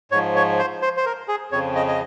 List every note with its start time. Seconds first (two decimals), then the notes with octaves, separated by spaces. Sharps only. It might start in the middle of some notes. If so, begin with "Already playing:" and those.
0.12 G#2 F3 C#5
0.36 C#5
0.59 C5
0.82 C5
0.97 C5
1.06 A#4
1.29 G#4
1.52 F2 C#3 F3 C#5
1.75 D#5
1.88 D#5